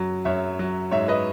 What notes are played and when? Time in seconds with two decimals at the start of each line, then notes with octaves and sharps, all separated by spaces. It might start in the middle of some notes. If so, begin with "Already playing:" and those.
Already playing: F#2 F#3
0.25 F#2 C#5 E5
0.59 F#3
0.91 G#2 C#5 E5
1.08 B4 D#5